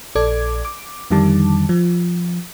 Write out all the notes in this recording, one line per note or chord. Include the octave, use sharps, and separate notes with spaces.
A#1 A4 D5 D6 G#6
D6
F2 D3 D#3 G3 A5 D6
F3